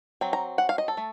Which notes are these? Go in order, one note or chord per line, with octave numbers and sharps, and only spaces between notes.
F#3 C4
A#5
F#5
F5
D#5
A4
A3